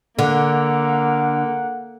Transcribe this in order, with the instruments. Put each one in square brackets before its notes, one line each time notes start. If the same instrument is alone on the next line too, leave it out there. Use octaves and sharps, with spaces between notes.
[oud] D3 [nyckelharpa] A#3 [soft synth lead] F#5